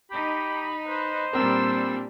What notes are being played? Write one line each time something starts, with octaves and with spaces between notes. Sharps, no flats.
D#4 G4 B5
B4 C5
A#2 G3 C4 D4 A#4 E6